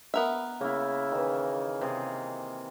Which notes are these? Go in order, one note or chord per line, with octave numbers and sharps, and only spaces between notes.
B3 A#4 E5
C#3 A#3 E4
D#3 E3
C3 G#4